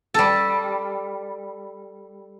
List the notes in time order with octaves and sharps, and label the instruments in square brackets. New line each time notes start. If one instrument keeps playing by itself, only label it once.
[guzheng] G3 A4